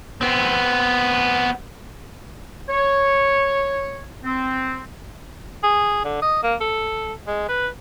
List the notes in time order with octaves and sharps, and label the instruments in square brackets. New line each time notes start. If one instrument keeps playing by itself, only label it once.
[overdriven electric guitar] B3 C4
[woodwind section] C#5
C4
[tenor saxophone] G#4
D3
D#5
A#3
A4
G#3
B4